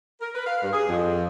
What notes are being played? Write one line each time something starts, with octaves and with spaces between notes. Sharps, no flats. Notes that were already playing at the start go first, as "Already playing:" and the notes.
A#4
B4
F5
G2
G#4
F2